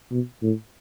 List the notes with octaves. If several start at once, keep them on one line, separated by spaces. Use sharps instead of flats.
B2
A2